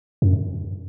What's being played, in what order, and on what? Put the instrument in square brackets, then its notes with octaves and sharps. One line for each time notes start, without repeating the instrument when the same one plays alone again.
[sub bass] F#2